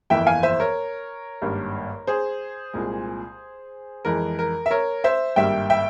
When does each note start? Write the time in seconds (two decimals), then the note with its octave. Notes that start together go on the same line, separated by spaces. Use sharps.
0.10 G1 F2 E3 A#3 E5 G5
0.27 F5 G#5
0.43 C5 E5
0.60 A#4 C#5
1.42 G#1 G2 G3 A#3
2.07 G#4 C5
2.73 C2 A#2 G#3
4.05 F2 E3 G#3 A#4
4.39 A#4
4.66 E5
4.71 A#4 C#5
5.04 C5 E5
5.36 G#1 G2 G3 A#3 E5 G5
5.70 E5 G5